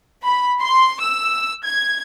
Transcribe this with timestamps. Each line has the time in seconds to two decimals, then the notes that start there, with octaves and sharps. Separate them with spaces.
0.24 B5
0.61 C6
1.01 E6
1.64 G#6